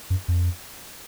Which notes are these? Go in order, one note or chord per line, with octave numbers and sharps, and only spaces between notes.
F#2
F2